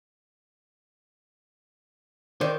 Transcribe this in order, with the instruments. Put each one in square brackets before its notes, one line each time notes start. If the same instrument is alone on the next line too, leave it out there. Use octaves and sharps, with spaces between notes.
[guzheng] D#3 [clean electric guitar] C5 D5